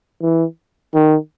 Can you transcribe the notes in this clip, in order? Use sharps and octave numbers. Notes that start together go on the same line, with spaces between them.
E3
D#3